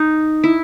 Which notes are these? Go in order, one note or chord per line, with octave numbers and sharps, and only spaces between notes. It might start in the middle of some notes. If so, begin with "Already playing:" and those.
Already playing: D#4
E4